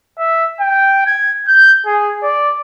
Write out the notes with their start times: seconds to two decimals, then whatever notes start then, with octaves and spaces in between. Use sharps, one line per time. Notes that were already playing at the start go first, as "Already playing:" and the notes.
0.18 E5
0.60 G5
1.06 G#6
1.48 G6
1.86 G#4
2.23 D5